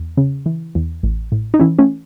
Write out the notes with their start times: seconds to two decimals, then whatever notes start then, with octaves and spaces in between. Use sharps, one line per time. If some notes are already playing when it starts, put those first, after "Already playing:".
Already playing: E2
0.17 C#3
0.46 E3
0.75 E2
1.03 A1
1.32 A2
1.54 D#4
1.60 E3 C#4 E4
1.79 A3 C#4